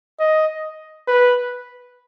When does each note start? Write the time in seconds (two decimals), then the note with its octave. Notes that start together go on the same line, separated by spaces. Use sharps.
0.19 D#5
1.08 B4